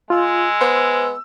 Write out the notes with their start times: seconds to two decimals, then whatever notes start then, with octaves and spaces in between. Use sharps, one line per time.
0.10 G#3 F4 E6
0.61 B3 C5